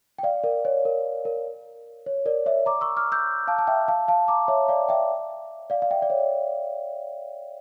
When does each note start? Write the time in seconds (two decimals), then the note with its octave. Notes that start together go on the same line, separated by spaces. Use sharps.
0.19 G5
0.23 D5 F5
0.44 A#4 D5
0.65 C#5
0.85 A#4
1.25 A#4
2.06 C#5
2.26 A#4 D5
2.46 C#5 E5
2.66 A#5 D6
2.81 C#6 E6
2.97 D6 F6
3.12 E6 G6
3.47 F5 A5
3.59 A5
3.67 E5 G5
3.88 F5 A5
4.08 F5 A5
4.28 A#5 D6
4.48 C#5 E5
4.68 D5 F5
4.89 E5 G5
5.70 D5 F5
5.82 F5
5.91 E5 G5
6.02 D5
6.10 C#5